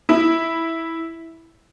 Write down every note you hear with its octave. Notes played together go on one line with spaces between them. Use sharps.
E4